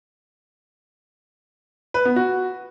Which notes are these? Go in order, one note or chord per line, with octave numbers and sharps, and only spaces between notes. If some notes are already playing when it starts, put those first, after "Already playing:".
B4
B3
F#4